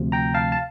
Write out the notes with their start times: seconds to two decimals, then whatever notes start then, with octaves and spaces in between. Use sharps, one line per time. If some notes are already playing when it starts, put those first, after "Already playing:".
Already playing: D2 C3 F3
0.12 G5 A#5
0.34 F5 A5
0.52 A5